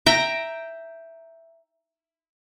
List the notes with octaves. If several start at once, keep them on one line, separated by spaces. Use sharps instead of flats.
E5 G5 A#5